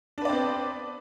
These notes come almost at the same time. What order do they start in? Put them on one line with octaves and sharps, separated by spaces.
D4 B4 D5 C4 B3